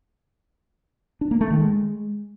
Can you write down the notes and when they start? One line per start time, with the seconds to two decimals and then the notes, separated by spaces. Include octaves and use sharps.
1.21 D4
1.31 A#3
1.41 A3
1.50 D#3
1.60 G#3